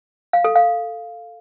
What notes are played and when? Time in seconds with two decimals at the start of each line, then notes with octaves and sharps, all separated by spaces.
0.33 F5
0.44 A4
0.56 F5